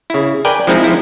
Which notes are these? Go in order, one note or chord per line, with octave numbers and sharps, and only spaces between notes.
C#3 E4
A#4 B4 D5 G5 G#5
F3 G#3 C4 D#4 E4
F3 E4